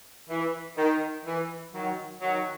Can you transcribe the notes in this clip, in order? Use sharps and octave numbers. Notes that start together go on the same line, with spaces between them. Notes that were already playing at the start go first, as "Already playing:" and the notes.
E3
D#3
E3
D#3 F#3
D#3 F#3